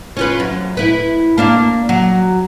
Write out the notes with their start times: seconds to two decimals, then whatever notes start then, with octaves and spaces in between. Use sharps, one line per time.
0.17 C#4 F4 B4
0.40 F#2
0.77 E4 B4
1.38 A#3 D4 F5
1.89 F#3